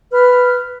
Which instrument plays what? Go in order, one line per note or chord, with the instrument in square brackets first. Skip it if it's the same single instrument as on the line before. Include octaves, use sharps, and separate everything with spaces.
[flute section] B4 F6